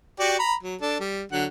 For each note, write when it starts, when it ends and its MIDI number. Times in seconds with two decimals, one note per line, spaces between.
0.19 0.38 66
0.19 0.38 67
0.19 0.38 74
0.39 0.55 82
0.39 0.55 83
0.63 0.76 54
0.81 0.99 62
0.81 0.99 69
1.00 1.23 55
1.32 1.46 50
1.32 1.46 54
1.32 1.46 78